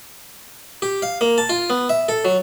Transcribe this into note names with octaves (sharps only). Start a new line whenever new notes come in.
G4
F5
A#3
A5
F4
B3
E5
A4
F#3